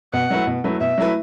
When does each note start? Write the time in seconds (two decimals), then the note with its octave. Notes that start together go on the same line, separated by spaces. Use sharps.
0.13 B2 F#5
0.30 F#3 A3 E4 B4
0.47 B2
0.64 F#3 A3 E4 B4
0.81 B2 E5
0.98 F#3 A3 E4 B4